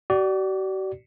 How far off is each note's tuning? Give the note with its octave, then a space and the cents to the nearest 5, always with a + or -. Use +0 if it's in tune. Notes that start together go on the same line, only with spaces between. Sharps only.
F#4 +45 D5 +0